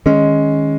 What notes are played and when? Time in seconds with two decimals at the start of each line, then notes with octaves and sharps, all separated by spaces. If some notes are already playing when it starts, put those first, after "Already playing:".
0.06 D#3 G#3 C#4